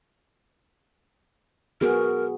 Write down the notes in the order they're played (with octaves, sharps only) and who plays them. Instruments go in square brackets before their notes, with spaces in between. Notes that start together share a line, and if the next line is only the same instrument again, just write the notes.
[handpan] B3 F#4 G#4 [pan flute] A#4